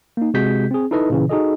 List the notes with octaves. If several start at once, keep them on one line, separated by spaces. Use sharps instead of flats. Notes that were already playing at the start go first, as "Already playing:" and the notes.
A#3 D#4
C3 G#3 F#4 G#4 G6 B6
C4 G#4
D#4 E4 A4 B4 D#5
A#2 C#3 E3
D#4 F#4 G#4 A4 D#5